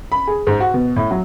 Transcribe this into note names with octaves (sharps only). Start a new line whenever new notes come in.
B5
G#4
G#2
F#4
B2
A2
F#3